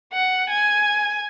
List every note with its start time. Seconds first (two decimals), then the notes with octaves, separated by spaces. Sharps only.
0.13 F#5
0.50 G#5